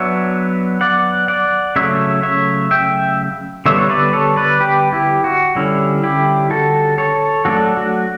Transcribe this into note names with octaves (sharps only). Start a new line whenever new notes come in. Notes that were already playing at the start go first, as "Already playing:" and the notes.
Already playing: F#3 B3 D4 C#5 E5
D5 F#5
D5 F#5
C#3 F#3 A3 C#5 E5
C#5 E5
E5 G5
D3 G3 B3 D4 C#5 E5
C#5
B4 D5
A4 C#5
B4 D5
G4 B4
E4 G4
F#4
D3 G3 C#4 E4
E4 G4
F#4 A4
A4 C#5
F#3 A3 D4 F#4 A4
F#4